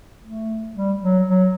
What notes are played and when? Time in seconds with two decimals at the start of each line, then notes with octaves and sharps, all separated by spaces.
0.22 A3
0.75 G3
1.02 F#3
1.28 F#3